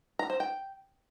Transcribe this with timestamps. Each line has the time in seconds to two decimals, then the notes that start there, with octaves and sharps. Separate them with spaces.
0.19 A#5
0.30 C5
0.40 G5